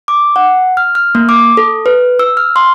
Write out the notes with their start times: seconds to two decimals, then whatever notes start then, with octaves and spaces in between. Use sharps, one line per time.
0.08 D6
0.36 F#5
0.77 F6
0.95 F6
1.15 A#3
1.29 D6
1.57 A4
1.86 B4
2.19 E6
2.37 F6
2.56 C6